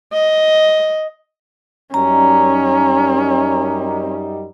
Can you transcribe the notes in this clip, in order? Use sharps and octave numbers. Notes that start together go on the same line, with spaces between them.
D#5
F#2 G3 C#4 D#4 A#5